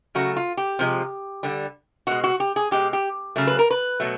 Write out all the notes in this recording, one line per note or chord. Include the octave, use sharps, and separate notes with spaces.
C#3 F#3 A3 F#4
F4
G4
C3 F3 G#3
D3 G3
B2 G#3 F#4
F#4
G4
G#4
B2 G#3 G4
G4
C#3 F#3 A3
B4
A#4
B4
B2 F#3 A3